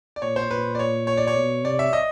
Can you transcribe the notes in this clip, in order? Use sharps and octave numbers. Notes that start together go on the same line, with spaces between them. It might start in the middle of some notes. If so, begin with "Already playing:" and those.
D5
A#2 C#5
C5
A#2 B4
D5
C#5
C#5
D5
C#5
B2
C3 D5
E5
D#5